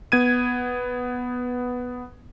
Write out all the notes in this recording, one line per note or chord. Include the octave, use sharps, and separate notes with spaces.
B3 G#6 D#7